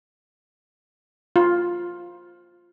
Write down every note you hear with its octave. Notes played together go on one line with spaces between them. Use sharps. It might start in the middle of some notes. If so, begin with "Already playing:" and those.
F4